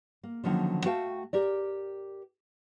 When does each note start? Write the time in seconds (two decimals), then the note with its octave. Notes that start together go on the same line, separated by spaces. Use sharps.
0.23 A#3
0.44 D3 D#3 F3 F#3 A#3 C#4
0.85 A3 F#4 F5 G5 A5
1.33 G4 A#4 D5